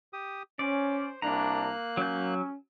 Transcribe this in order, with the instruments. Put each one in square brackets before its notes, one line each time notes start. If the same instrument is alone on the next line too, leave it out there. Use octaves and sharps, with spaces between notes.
[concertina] G4 D#6
[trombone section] C#4 [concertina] C5 [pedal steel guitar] D5
[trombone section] C2 D4 [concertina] A#3 F#6 [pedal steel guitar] A#5
[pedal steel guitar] F#3 G6 [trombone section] C#4